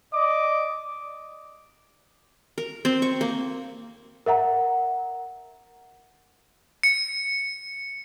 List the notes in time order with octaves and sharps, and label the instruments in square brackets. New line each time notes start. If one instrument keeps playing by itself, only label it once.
[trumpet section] D5 D#5 D6
[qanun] A#4
C4
C#6
A#3
[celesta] A#4 E5 F#5 A#5
[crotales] C#7